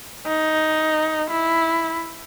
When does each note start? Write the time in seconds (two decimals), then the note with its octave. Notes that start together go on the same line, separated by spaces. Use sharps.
0.27 D#4
1.31 E4